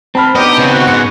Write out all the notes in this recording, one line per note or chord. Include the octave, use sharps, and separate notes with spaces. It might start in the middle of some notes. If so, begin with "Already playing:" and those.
C4 A5 B5 F6
D3 F#3 B3 D#4 G4 D#5
C#3 C4
F#4
G#2 G#3 F#4 F#6 C#7